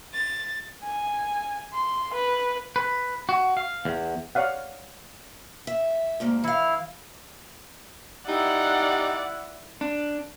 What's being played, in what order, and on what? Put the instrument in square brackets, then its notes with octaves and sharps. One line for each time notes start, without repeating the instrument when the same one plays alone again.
[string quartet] A6
[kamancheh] G#5
C6
B4
[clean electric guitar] B4
F#4
F5
E2
[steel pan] C#5 D5 F5 F#5
[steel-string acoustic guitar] E5
D2 G#2 A#3
[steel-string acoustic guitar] E3 F5 [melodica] E4
[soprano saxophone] D#4 [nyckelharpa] E4 [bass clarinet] G4 [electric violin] D5 F#5
[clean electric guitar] D4